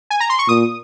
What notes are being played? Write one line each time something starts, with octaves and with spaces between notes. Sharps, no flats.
G#5
A#5
C6
C#6
A#2 D#6